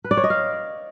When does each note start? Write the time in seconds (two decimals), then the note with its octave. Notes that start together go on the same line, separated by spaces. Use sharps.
0.04 B4
0.11 D5
0.17 C#5
0.24 D#5
0.30 F5